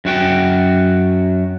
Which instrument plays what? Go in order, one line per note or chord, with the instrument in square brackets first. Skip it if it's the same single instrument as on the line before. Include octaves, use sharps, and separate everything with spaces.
[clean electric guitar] F#2 F#4 G5